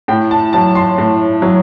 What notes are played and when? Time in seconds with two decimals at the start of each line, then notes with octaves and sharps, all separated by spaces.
0.08 A2 G5
0.31 A5
0.53 F#3 A5
0.75 C6
0.98 A2
1.42 F#3